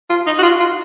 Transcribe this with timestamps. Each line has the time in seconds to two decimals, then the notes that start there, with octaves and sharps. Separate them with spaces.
0.10 F4
0.27 D#4
0.39 F#4
0.43 F4
0.60 F4